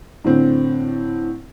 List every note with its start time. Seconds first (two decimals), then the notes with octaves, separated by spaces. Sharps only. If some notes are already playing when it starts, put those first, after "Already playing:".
0.24 A2 D3 C4